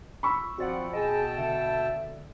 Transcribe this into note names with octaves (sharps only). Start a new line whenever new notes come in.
B5 C#6 E6
F3 C4 F4 F#4 D5 F#5
B2 G#4 D#5 G5 A5
D3 E5